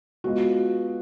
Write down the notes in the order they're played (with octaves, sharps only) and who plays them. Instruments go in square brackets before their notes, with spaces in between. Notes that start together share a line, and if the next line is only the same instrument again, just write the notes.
[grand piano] G#3 B3 F4 B4 D#5 [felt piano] F#4